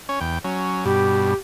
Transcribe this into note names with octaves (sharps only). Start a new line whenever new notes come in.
C#4 C#5
E2 G5
F#3 C#4
G2 B2 G4